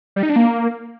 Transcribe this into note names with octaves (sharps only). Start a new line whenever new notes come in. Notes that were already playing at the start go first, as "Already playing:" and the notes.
G3
D#4
D4
A#3